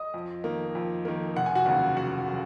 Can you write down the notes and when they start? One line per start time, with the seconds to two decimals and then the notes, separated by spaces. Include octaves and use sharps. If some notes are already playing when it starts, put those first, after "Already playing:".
Already playing: D#5 D#6
0.14 F2
0.44 D#3 A#3
0.75 F2
1.05 D#3 A#3
1.36 F1 F#5
1.46 G#5
1.55 F#4 F#5
1.66 D#2 C#3 F#3
1.97 F1 F#4 F#5
2.28 C#3 F#3